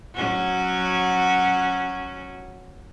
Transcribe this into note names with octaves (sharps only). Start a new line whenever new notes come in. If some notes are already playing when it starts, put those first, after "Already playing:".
F#3 C#4 F#4